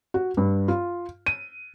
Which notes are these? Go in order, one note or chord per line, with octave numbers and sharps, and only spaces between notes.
F#4
G2
F4
D#7